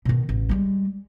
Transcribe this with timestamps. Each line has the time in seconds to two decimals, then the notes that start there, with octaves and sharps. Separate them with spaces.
0.05 B2 D#3
0.29 A1
0.49 G3 G#3